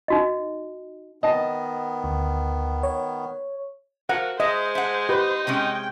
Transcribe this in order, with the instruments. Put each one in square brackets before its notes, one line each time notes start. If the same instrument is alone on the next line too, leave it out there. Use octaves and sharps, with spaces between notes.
[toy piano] D#4 F#4 D#5
[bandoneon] D#3 B3 [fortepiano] D#5 A5
[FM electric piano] D2
C#5
[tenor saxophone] F3 [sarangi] F#4 [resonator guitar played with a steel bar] A#4 [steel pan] F#5
[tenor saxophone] G#3 [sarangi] C5 [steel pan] D#5 [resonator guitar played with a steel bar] E5
[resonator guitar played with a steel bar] E5 F#5
[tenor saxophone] D#4 [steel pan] G4 B4
[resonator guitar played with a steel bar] C3 G#3 C#4 [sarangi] G5